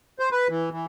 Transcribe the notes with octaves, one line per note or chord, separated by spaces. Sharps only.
C5
B4
E3
E3